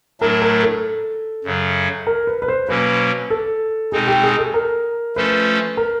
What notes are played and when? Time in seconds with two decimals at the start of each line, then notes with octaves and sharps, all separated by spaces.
0.20 A2 F#3 A3 D4 A#4
0.42 A#4
0.63 A4
1.44 F#2 C#3 F#3
2.07 A#4
2.27 B4
2.42 B4
2.48 C5
2.68 B2 F#3 A#3 C#4 B4
3.30 A4
3.92 B2 G#3 C4 D#4 G#4
4.07 G4
4.23 G#4
4.39 A4
4.54 A#4
5.16 F3 A3 C#4 F4 A4 B4
5.77 A#4